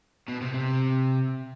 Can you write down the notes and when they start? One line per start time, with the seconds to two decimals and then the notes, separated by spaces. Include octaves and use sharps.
0.28 B2
0.41 C3
0.54 C3